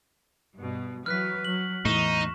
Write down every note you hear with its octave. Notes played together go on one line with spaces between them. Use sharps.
G2 B2
E3 F#3 B4 F6 F#6 B6
F#3 F#7
E2 A2 E3 D#4 C#6 E7